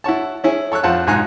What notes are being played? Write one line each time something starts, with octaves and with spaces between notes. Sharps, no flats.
E4 F#4 C#5 A5
C#4 E4 G#4
A4 C#5 E6 F#6
F2 F4 C5 F#5 A5
B1 G#2 G#5 A#5 F#6